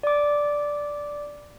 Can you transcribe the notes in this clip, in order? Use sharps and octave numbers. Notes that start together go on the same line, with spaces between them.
D5 D6